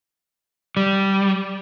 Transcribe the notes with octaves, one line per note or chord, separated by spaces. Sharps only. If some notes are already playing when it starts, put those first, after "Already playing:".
G3